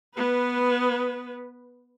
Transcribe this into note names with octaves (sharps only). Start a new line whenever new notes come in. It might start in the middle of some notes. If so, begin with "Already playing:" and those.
B3 B4